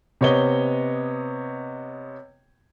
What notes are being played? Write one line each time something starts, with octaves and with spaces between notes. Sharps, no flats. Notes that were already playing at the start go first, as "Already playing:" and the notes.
C3 B3 C#5 D#5 G7